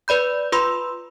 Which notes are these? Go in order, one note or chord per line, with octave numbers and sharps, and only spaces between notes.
B4 D5 B5 G6
F4 B4 B5 C6 E6